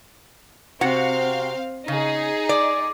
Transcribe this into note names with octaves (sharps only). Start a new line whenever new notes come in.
C3 C4 F#4 F5 F#5
C#3 D#4 G#4
D5